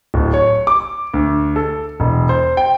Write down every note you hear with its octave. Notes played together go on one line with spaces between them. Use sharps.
D1
C#5
D6
D2
A4
E1
C5
G5